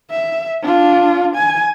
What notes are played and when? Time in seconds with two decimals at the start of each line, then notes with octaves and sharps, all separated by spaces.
0.10 E5
0.62 D4 F4
1.36 G#5